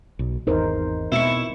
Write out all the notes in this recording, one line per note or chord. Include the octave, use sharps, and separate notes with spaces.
B1
G#1 E2 D#4 A#4 C5
B2 C4 E4 C#6